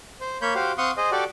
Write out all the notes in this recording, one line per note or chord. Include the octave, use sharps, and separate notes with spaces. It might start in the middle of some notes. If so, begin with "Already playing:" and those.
C5
A#3 C#5 B5 G6
F#4 G4 C5 F5
C4 F5 F#5 C6 C#6 D#6
G#4 C5 D#5
F#4 G4 A4 D5